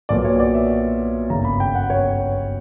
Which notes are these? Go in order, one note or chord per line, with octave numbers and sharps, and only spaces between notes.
B1 A#2 F#3 B3 D5
C#5
D5
E5
G1 F#2 C#3 A#5
B5
G5
F#5
C#5